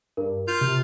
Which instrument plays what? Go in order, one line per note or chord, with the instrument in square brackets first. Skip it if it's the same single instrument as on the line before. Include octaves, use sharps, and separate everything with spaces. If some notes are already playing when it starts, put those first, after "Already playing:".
[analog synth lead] G2 [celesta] A#4
[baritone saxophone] F4 [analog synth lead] G6
[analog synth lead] C3